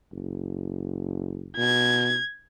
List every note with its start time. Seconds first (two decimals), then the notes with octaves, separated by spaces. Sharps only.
0.12 F#1
1.58 B2 G#6